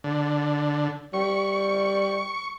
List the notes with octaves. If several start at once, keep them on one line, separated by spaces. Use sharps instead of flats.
D3
G3 C#6